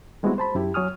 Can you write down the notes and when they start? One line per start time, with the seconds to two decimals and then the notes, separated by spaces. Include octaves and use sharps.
0.23 G3 G#3 B3 C4 E4 F#4
0.38 C5 A5 B5
0.55 F#2 E4 G4
0.74 F#3 C#5 G#5 D#6 F6